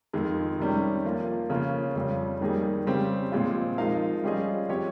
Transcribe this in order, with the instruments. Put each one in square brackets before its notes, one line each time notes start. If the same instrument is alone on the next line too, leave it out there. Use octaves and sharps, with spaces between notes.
[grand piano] F2 D#3 G#3
C3 D#3 G3 C#4
F3 A#3 F4
C#3 F3 A#3 C#4 F4
F2 C#3 G3
D#3 G3 A#3 D#4 G#4
C#3 G3 C4 G4
A#2 F3 G#3 C4 F4
F3 G#3 D#4 A#4 F5
G3 C#4 F4 G#4 D#5
F3 C4 G4 C#5